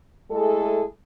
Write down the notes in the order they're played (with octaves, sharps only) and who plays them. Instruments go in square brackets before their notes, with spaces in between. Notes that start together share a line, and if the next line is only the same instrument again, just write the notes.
[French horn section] G#3 A3 E4 G#4 A4